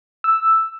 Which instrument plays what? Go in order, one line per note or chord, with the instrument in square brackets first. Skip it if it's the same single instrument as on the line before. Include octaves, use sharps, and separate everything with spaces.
[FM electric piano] E6